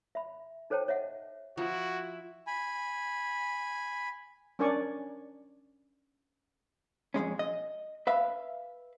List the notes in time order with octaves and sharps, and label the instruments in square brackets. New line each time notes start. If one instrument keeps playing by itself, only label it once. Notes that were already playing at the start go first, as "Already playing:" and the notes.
[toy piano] E5 B5
D#4 A4 C5 C#5 G5 A5
C#5 D#5 E5 F#5
[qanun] F3 [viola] E4 [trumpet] F#4
[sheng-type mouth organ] G#5 B5
[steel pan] C#4 D4 A#4 D5 G#5 C#6
[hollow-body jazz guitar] F2 G#2 G#3 C#4
D#5
B4 E5 F5